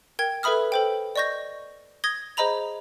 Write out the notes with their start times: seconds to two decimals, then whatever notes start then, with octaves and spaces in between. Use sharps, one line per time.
0.19 A#4 G5 G#6
0.43 A4 B4 E5 B5 D#6 F6
0.72 A4 C5 G5
1.16 D5 D#5 C#6 G6 A#6
2.04 D#6 G#6 A#6 G7
2.37 G#4 C5 D#5 A#5 B5 F7